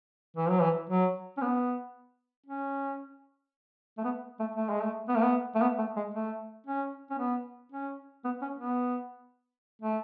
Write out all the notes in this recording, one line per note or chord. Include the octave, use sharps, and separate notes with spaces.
E3
F#3
E3
F#3
C#4
B3
C#4
A3
B3
A3
A3
G#3
A3
B3
A3
B3
A3
B3
A3
G#3
A3
C#4
C#4
B3
C#4
B3
C#4
B3
A3